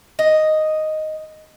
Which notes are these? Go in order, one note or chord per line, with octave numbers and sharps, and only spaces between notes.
D#5